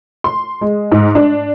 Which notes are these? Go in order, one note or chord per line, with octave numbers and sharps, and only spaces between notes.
C6
G#3
G#2
D4